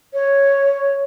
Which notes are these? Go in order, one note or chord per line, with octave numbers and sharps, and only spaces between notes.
C#5